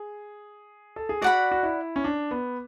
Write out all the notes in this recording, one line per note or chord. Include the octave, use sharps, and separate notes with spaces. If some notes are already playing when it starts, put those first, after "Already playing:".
Already playing: G#4
A4
G#4
F#4 D5 F#5 B5
F#4
E4
C#4
D4
B3